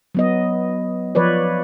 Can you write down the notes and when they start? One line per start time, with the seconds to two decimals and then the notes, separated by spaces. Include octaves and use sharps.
0.15 F#3 B3 D#5
1.15 F3 B4 C#5 D5